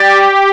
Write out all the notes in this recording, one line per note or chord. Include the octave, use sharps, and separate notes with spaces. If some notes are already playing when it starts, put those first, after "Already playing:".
Already playing: G4 D5